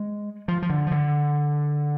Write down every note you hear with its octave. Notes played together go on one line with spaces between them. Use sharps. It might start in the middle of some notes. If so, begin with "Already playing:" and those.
Already playing: G#3
F3
F3
D3
F3
D3